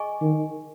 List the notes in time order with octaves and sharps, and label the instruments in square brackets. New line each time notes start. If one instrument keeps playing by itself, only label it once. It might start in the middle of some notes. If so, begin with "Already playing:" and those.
Already playing: [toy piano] G#4 D#5 G#5 C#6
[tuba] D#3